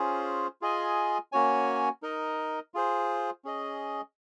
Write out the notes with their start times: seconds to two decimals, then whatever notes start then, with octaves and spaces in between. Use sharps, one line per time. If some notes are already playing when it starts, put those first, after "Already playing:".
Already playing: C#4 F4 G#4 C5
0.62 F4 G#4 D#5 G#5
1.32 A#3 C#4 F#4 C#5 G#5
2.02 D#4 A#4 D#5
2.74 F4 G#4 C5
3.45 C#4 G#4 D#5